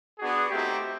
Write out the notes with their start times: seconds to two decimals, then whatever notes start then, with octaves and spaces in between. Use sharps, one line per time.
0.19 B3 D4 F#4 G#4
0.50 A3 C4 D#4 F#4 G4